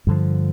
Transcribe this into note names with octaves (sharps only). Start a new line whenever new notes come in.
G2 D3 F3